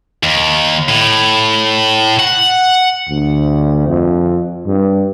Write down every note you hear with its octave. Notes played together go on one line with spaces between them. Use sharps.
D#2
A2
F#5
D2
F2
G2